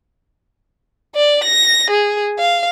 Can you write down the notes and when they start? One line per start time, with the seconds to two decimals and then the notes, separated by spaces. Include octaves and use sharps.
1.15 D5
1.44 A#6
1.91 G#4
2.39 F5